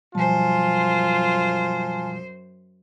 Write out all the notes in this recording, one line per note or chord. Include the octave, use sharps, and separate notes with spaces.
F#2 B2 F3 G3 F4 C5 G#5 A5